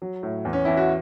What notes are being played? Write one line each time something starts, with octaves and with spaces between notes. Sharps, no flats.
F#3
A2
E2
C#4
E2 E4
F#4